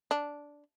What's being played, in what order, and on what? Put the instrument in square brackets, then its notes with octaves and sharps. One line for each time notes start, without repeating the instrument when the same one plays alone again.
[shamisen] D4